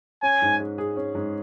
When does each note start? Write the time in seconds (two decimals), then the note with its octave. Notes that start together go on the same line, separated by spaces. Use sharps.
0.23 C#4 G#5
0.42 G#2
0.59 G#3
0.78 G#4
0.96 C#4
1.15 G#2